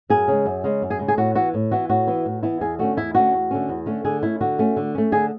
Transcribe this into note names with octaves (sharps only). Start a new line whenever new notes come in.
F#2 G#4
C#3 G#3
F#2
C#3 G#3
F#2
G#4
C#3 G#3
G#4
A2 F#4
E3 B3 E4 F#4
A2
E3 B3 E4 F#4
A2 F#4
E3 B3 E4
A2
E3 B3 E4
E2 G#4
D3 A3 C#4 F#4
E2 E4
D3 A3 C#4 F#4
E2
D3 A3 C#4
E2
D3 A3 C#4
D3 G#4
A3 C#4 E4
D3 F#4
A3 C#4
D3
A3 C#4
D3 G#4